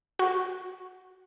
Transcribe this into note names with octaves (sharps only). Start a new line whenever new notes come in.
F#4